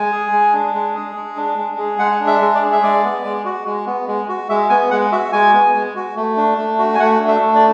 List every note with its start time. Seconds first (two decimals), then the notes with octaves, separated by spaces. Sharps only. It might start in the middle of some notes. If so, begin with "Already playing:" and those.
Already playing: G#3 G#5
0.12 G#4
0.32 G#3
0.53 D4
0.74 G#3
0.95 G#4
1.15 G#3
1.37 D4
1.57 G#3
1.78 G#4
1.99 G#3 F#5
2.20 D4
2.27 E5
2.41 G#3
2.55 D5
2.62 G#4
2.72 E5
2.83 G#3 D5
3.04 B3
3.24 G#3
3.45 F#4
3.66 G#3
3.86 B3
4.08 G#3
4.29 F#4
4.49 G#3 E5
4.70 B3 G#5
4.91 G#3 F#5
5.12 F#4 E5
5.32 G#3 G#5
5.54 B3
5.74 G#3
5.96 F#4
6.16 A3
6.37 D4
6.58 A3
6.79 F#4
6.95 G#5
6.99 A3 F#5
7.20 D4
7.28 E5
7.41 A3
7.55 D5